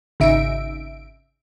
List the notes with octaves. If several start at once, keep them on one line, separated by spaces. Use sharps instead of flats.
G#1 C#3 D#4 E5 D7